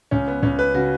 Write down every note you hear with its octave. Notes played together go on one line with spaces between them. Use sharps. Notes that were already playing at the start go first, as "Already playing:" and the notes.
C#2 C#4
B3
C#2 C#4
B4
C#3 F#4